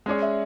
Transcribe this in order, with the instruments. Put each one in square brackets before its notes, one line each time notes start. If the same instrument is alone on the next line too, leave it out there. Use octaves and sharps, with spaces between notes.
[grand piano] G#3 C#4 G#4 C#5 [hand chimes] D5
[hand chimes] E5